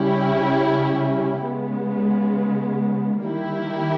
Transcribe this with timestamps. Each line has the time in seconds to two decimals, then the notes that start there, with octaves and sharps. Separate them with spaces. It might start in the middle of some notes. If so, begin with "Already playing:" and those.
Already playing: C#3 G3 C#4 E4 G4
1.42 C#3 G#3 B3
3.22 D#3 G3 A#3 E4 G4